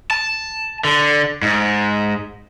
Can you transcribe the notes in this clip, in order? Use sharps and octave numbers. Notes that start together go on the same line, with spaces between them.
A5
D3
G#2